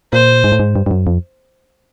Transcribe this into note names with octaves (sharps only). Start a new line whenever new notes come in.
A#2 C5
G#2
A2
G#2
G2
G2
F#2
F2